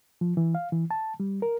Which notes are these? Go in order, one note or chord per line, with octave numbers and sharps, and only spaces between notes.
F3
E3
F5
E3
A5
G3
A#4